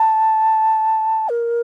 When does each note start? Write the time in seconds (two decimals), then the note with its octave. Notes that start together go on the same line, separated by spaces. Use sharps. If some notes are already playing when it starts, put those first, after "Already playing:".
Already playing: A5
1.29 A#4